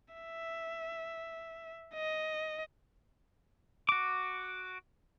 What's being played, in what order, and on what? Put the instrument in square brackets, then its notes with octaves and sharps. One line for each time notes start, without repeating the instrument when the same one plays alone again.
[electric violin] E5
D#5
[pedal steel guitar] F#4 D6